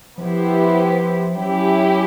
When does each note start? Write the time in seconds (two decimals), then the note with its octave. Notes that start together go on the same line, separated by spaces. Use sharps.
0.17 F3 B3 E4 G4 C5
1.35 F#3 C#4 E4 G4